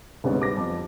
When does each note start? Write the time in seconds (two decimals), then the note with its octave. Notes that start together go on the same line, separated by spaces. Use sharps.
0.24 D2 G#2 C3 G3 B3 C#4
0.40 B4 D6 A#6
0.57 F2